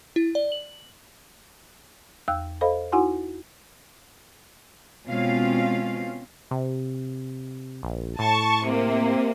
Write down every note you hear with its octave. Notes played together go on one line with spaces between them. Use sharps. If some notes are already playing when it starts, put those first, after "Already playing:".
E4
D5
F#7
E2 G5 E6 F#6
A4 C5 D#5 F5 B5
D#4 E4 F#4 F#5 G#5 C6
B2 G#3 C4 C#4 F4 F5
C3
A#1
A2 A5 C#6
C3 A#3